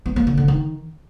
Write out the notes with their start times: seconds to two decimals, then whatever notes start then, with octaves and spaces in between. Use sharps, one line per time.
0.06 B3
0.16 A#3
0.27 D3
0.37 D3
0.48 D#3